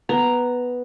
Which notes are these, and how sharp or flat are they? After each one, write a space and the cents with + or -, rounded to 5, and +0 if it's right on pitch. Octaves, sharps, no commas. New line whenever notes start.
B3 +0 A#5 +0